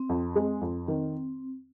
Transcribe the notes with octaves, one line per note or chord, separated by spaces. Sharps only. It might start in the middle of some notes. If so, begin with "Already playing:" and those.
Already playing: C4
F2
G#3
F2
D#3